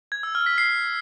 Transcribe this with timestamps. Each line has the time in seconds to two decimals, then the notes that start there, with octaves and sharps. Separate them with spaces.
0.12 G#6
0.23 E6
0.35 F6
0.46 B6
0.58 C7